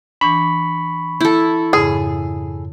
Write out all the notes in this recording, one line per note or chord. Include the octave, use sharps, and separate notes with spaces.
E3 D4 B5 C#6
E4 A4 G6
F2 G#2 C#3 G#4